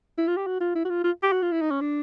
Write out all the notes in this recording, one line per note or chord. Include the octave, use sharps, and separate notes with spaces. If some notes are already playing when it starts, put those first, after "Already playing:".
E4
F4
G4
F#4
F4
E4
F#4
F4
F4
G4
F#4
F4
E4
D#4
C#4
D4